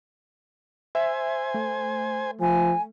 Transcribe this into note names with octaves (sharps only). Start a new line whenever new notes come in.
C5 E5 G#5
A3
F3 G#5